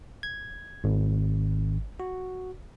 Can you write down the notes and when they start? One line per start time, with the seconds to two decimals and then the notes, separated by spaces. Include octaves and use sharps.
0.23 G#6
0.84 G#1
2.00 F#4